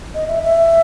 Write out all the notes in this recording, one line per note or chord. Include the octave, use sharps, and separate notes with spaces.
D#5
E5
E5